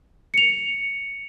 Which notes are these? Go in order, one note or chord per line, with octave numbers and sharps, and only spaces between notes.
C#7 F7